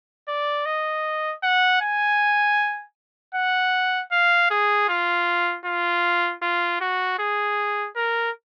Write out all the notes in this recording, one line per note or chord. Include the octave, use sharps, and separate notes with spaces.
D5
D#5
F#5
G#5
F#5
F5
G#4
F4
F4
F4
F#4
G#4
A#4